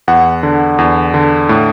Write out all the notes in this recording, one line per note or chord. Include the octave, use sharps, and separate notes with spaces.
E2 F#5
D3
E2
D3
A2